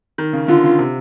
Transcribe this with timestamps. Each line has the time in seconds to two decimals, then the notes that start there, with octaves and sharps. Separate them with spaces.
0.18 D#3
0.33 C#3
0.48 D3 F4
0.64 C#3
0.79 C3